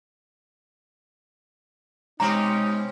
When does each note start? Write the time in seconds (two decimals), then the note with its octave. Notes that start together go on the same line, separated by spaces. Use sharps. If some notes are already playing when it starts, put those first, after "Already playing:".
2.20 B2 G#3 C4 C#4 D#4 A#5